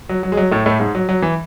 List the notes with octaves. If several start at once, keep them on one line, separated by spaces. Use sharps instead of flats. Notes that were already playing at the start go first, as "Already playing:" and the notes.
F#3
F#3
G#3
F#3
A2 A3
A2 A3
G#2 G#3
F#3
F#3
E3